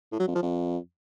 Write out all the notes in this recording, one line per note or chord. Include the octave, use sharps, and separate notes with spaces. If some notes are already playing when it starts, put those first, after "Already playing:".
A2
F#3
F2
F3
F2